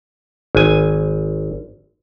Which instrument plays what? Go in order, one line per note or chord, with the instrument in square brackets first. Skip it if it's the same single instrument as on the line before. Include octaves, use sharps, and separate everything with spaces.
[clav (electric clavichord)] G#1 G#5